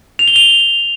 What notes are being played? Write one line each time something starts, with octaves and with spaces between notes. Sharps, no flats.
F7
G7
F7